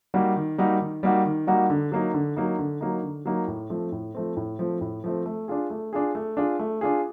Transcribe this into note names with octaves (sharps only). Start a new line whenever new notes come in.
G3 A#3 D#4 F#4
D#3
G3 A#3 D#4 F#4
D#3
G3 A#3 D#4 F#4
D#3
G3 A#3 D#4 F#4
D3
F#3 A#3 D#4
D3
F#3 A#3 D#4
D3
F#3 A#3 D#4
D3
F#3 A#3 D#4
A2
F3 A3 C4
A2
F3 A3 C4
A2
F3 A3 C4
A2
F3 A3 C4
A3
D4 F4 G#4
A3
D4 F4 G#4
A3
D4 F4 G#4
A3
D4 F4 G#4